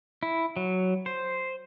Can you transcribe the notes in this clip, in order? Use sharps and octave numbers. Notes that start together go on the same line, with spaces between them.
E4
F#3
C5